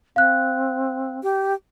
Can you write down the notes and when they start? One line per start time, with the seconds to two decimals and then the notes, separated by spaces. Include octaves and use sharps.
0.16 C4 F5 F#6
1.23 G4